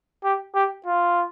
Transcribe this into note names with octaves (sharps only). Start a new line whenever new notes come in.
G4
G4
F4